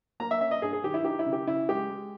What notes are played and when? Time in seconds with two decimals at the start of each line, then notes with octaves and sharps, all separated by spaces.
0.20 A#3 A#5
0.31 E5
0.41 C#4 E5
0.51 D#5
0.62 G2 G#4
0.73 G#4
0.84 D#3 G4
0.94 E4
1.04 D#4 G4
1.19 E4
1.26 C#3
1.33 G4
1.47 C#3 E4
1.69 G#3 G4
1.90 G#3